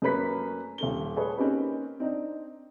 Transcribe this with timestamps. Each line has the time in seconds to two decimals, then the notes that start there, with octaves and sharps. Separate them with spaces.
0.02 F#2 A3 A#3 B4 C#5 B6
0.78 D#1 A3 G7
1.16 G#4 A4 B4 C#5
1.38 A#3 C4 C#4 D#4 G4 B4
2.00 C4 D4 D#4